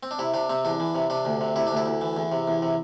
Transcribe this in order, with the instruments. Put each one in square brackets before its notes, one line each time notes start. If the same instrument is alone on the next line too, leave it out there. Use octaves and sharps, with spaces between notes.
[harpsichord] C4
D4
C3 E4
C3 D4
C3 C4
E2 D4
E3
C3
C3 D4
D2
C3
C3 E4
D2 D4
E4
D2
E3
E2
C3
E2
C3